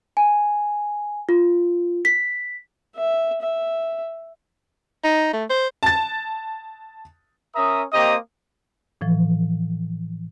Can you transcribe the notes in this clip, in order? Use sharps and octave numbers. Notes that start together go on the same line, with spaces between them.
G#5
F4
B6
E5
E5
D#4
A3
C5
A5 A6
C#4 A#4 E5 A#5 D#6
A#3 C4 G4 D#5 A#5 D#6
A2 E3 F3